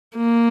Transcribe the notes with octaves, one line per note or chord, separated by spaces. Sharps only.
A#3